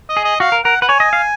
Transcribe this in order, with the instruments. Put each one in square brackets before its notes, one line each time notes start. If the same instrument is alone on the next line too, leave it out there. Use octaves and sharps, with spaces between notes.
[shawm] D#5
[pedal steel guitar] G#4
[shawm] D#5
[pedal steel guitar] F#4 [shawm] F5
[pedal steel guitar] A#4
[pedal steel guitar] A#4 [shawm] F#5
[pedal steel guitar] B4 [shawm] F#5
[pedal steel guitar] C#5 [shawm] G#5
[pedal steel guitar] D#5
F5